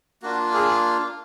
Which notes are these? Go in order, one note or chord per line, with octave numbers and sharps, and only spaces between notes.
A#3 D4 F4 F#4
G#4